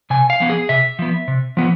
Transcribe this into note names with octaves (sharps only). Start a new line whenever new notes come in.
C3 G#5
F5
F3 B3
G#4
C3 E5
F3 B3
C3
F3 B3